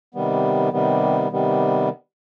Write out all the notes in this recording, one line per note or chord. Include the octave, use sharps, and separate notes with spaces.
C3 D#3 G3 B3
C3 D#3 G3 B3
C3 D#3 G3 B3